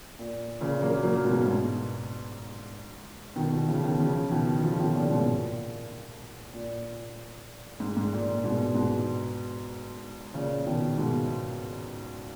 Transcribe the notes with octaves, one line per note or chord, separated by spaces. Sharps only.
A#2
A#2 C#3
F#3 A#3
F#3 A#3
G#2 B2
G#2 B2
B2 D#3
B2 D#3
C#3 F3
B2 D#3
C#3 F3
B2 D#3
C#3 F3
B2 D#3
A#2 C#3
G#2 B2
A#2
A#2
G#2
G#2
A#2
A#2
G#2 B2
G#2 B2
A#2 C#3
B2 D#3
G#2 B2